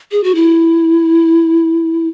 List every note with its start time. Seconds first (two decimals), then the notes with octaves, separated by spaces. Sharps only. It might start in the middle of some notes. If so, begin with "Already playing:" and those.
0.12 G#4
0.24 F#4
0.35 E4